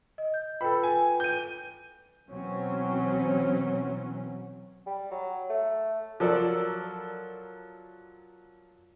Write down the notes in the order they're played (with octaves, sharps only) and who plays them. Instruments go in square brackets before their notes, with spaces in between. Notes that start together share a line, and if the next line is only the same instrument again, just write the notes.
[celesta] D#5
G6
[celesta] F4 B4 G5 [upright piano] A4 B5
[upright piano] G#5
G6 D#7
[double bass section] B2 E3 F#3 C4 C#4
[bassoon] G3
F#3
A3
[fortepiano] F3 F#3 A4 A#4 D5